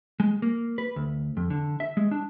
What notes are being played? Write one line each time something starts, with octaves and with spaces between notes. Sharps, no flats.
G#3
A#3
B4
D2
F2
D3
E5
G#3
D4